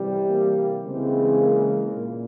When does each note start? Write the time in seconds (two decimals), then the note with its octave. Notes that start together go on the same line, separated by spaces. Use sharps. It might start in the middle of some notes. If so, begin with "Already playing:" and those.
Already playing: C3 E3 G3
0.30 A#3
0.85 C#3 E3 G#3 C4
1.41 A#3
1.96 A#2